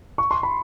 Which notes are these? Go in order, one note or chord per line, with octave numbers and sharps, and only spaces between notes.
C#6
C6
B5